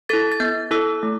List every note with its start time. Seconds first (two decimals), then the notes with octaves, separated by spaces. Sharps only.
0.09 E4 A4 A6
0.32 A6
0.40 B3 G6
0.71 E4 A4 E6
1.03 A3